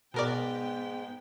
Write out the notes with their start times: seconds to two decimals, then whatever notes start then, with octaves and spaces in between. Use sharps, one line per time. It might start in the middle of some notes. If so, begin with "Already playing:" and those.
0.14 G#2 B2 B3 A#4 D5 G5